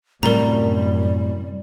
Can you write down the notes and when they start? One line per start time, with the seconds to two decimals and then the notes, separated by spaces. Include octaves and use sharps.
0.23 F#2 A2 C3 G3 A#4 A#5